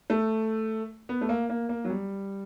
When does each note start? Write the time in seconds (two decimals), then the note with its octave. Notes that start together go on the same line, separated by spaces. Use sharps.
0.10 A3
1.09 B3
1.21 A3
1.29 A#3
1.50 A#3
1.69 A#3
1.84 F#3
1.90 G3